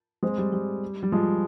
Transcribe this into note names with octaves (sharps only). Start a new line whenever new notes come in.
G#3 C4
G3
G3
G3
F3 G#3